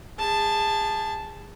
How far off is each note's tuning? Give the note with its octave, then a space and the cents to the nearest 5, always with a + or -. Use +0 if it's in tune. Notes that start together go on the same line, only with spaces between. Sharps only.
G#4 -30 A5 +0